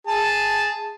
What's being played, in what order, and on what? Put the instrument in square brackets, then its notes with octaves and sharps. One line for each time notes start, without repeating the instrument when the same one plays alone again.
[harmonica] G#4 A5